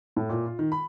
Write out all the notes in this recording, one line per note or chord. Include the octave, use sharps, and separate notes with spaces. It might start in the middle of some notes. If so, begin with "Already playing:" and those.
A2
A#2
F4
D#3
B5